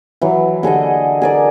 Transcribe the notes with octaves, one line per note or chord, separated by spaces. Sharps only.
E3 F#3
D3 G#4 A4 D#5
G#4 A#4 D5